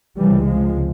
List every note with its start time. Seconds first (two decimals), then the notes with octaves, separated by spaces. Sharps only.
0.20 C#2 C3 E3 G3
0.49 F3 G#3